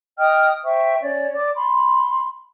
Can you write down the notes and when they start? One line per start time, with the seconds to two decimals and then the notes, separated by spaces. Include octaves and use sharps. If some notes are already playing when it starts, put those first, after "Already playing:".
0.19 D#5 G5 D#6 F6
0.64 C5 E5 G5 C#6
1.02 C#4 C#5 D5
1.34 D5 D6
1.56 B5 C6